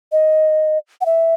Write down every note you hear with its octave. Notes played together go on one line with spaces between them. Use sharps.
D#5
F#5
E5